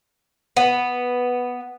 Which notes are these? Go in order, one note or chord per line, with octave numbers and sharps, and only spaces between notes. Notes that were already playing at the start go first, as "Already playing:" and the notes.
B3